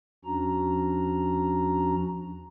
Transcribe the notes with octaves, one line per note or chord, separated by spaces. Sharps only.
E2 F3 C#4 D4 F#4 A#5